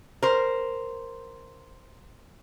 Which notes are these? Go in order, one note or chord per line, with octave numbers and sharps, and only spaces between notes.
A#4 C5